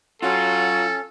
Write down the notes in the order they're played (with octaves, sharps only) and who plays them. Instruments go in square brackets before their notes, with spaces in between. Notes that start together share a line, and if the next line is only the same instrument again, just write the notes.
[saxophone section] F#3 F#4 [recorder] C#4 [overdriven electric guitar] F4 [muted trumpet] A4